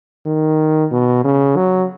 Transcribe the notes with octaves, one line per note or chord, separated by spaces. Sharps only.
D#3
B2
C#3
F#3